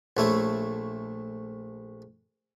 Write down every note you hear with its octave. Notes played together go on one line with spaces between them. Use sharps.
A#1 A3 E4 C#5